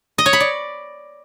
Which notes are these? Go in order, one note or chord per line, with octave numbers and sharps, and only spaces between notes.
D#5
C#5
B5
D5